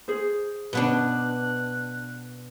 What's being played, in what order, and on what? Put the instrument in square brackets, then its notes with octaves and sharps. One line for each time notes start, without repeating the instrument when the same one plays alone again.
[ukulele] G#4 C5
[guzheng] B2 B3 D4 [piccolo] F#6